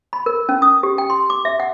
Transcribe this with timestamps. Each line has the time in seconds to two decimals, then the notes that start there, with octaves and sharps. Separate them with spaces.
0.13 B5
0.26 A#4
0.49 C#4
0.62 D#6
0.83 G4
0.98 G5
1.10 C6
1.30 D6
1.45 E5
1.60 F#5